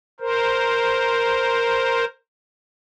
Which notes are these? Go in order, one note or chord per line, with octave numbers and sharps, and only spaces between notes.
A#4 C5